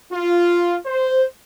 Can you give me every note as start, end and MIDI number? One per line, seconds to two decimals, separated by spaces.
0.12 0.75 65
0.85 1.23 72